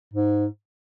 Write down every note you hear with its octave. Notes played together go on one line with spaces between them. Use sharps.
G#2